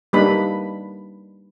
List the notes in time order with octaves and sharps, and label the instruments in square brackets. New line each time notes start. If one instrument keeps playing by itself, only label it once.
[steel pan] G3 A#3 D4 D#4 B4 B5